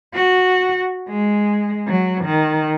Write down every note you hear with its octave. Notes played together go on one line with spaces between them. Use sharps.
F#4
G#3
F#3
D#3